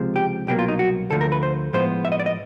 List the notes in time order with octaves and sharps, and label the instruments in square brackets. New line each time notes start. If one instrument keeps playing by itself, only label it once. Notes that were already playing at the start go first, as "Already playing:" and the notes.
Already playing: [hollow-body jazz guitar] C#2 C3 F3 G#3
G4
C2 B2 F#3 A#3 G4
F4
D#4
F#4
D2 D3 F3 A3 A4
A#4
B4
C5
A2 F3 G#3 B3 C5
E5
D#5
D5
D#5